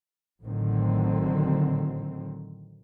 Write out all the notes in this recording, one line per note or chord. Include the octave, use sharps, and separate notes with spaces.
A1 A2 D3 D#3 F#3 C4